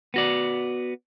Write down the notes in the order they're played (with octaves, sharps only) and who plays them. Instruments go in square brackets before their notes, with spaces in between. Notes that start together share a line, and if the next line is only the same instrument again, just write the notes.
[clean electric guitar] B3 F#4 D5